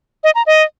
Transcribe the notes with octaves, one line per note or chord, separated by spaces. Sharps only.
D#5
A#5
D#5